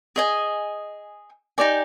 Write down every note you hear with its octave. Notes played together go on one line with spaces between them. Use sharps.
G#4 D#5 G#5
D#4 G4 D5 G#5